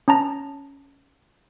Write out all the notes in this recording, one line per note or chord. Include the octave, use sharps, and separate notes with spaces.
C#4 A5 A#5